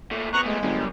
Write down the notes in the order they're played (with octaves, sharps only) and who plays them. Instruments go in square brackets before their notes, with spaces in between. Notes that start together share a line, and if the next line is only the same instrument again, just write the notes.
[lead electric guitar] A#2 A3
[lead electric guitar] F2 B3 [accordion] A#5 C#6 F#6
[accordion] G#3 [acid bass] A3
[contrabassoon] G1 [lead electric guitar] F#2 [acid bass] G3